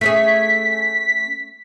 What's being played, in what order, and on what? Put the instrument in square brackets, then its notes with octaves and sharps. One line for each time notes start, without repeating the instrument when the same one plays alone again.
[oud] A3 C#4 G#4 [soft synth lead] B6